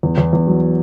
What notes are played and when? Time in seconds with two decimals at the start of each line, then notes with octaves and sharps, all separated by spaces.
0.03 E2
0.18 E2
0.33 E2
0.47 F#3